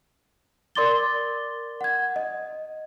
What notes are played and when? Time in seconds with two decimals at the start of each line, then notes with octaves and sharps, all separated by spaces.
0.75 A#4 D5 C6 D6 A6 G7
1.81 F#5 G#6
2.16 D#5